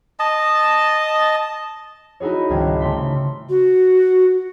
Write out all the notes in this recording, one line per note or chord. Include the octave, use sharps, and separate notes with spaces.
D#5 A5
D#4 E4 F#4 G#4 C#5
G#1 C#2 G3 G#3 G#6 C7
C#3 A3 C6 B6
F#4